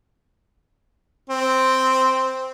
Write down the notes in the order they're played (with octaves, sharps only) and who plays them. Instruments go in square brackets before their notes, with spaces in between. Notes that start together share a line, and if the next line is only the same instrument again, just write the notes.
[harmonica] C4